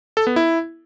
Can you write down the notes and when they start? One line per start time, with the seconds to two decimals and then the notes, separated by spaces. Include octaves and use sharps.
0.17 A4
0.27 B3
0.36 E4